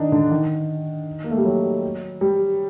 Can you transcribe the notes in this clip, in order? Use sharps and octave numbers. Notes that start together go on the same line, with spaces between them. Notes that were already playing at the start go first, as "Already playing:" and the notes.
Already playing: D#3 D4 D#4
D3
D#3
A#3
A3
G3
F#3
G3